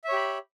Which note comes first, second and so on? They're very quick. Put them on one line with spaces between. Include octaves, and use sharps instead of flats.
E5 C#5 G4 B5